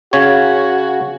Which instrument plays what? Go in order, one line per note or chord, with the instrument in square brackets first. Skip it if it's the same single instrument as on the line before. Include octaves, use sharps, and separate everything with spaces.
[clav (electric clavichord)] C#3 C#5 [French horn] F#4